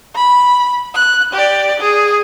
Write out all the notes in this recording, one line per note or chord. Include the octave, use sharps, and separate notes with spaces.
B5
F#6
G4 D5
G#4